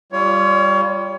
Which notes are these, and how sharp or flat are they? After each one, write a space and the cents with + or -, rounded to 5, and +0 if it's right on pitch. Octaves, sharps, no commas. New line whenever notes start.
G3 +0 F4 -10 C#5 +25